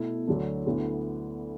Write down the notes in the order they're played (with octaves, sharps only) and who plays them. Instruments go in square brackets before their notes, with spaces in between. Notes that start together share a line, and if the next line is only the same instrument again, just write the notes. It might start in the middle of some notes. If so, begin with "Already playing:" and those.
Already playing: [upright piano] B2 A3 E4
D2 D3 F#3 D4 A4
D2 D3 B3 E4 A4